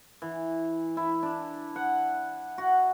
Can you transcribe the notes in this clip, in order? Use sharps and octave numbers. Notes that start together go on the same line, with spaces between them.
E3
E4
D4
F#5
F#4